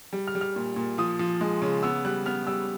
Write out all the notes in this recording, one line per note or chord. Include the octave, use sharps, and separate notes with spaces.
G3
F6
G3
F6
A#2
A#2
F3 D#6
F3
G#3
C#3
B3 E6
G3 F#6
B3 F6
G3 E6